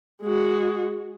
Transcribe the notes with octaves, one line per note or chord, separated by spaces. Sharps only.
G#3 F#4